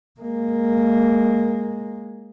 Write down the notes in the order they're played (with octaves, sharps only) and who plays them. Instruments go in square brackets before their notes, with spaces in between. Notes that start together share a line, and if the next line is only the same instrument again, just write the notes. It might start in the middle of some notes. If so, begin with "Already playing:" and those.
[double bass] G#3 A#3